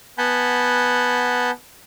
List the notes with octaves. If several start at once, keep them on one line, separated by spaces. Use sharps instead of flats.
B3 F#5 G#5 A5 B5 G6